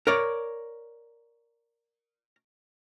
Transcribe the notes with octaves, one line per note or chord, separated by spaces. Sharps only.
A#4 C#5 D5